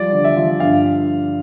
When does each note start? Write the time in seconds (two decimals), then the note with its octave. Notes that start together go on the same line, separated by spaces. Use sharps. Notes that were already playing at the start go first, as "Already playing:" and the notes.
Already playing: F3 G3 D5
0.12 D3
0.24 E5
0.36 F3
0.60 G2 F5